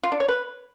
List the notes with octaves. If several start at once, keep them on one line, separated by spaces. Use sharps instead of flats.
F4
D4
C#5
B4